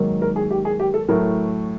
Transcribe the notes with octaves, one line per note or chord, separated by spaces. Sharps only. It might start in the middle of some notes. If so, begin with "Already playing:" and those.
Already playing: G#2 D#3 F#3 A#3
A#4
G#4
G4
G#4
G4
A4
A2 F#3 A3 A#4